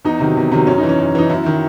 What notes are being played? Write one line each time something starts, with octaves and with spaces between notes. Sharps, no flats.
E2 D#4
C3 D#3 F#3
E2
C3 D#3 F#3
F#2 C#4
E3 D#4
C#4
F#2
E3 D#4
F#2 E4
D#3 F#3